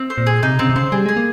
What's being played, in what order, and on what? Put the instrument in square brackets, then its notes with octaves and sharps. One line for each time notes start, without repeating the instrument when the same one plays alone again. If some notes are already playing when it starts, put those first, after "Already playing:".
Already playing: [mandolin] C4
C5
[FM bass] A#2
[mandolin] G#4
[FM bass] C3 [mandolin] D#4
[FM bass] C#3 [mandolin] C4
[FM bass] C3
[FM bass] C#3 [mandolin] C5
[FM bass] G3 [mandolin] G#4
[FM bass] G#3 [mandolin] G#4
[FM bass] A#3